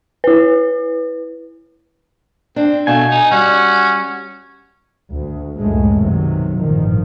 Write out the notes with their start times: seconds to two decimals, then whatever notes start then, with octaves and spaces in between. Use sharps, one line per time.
0.24 E4 B4
2.56 C4 D4
2.87 B2 A3 F5 G#5
3.11 D#4
3.31 G3 C#4 F#4
5.13 D2
5.57 C#2 F#2 A2 C#3 G#3 A3
5.98 B1 C3 D#3 F#3
6.60 A1 G2 A#2 D#3 F3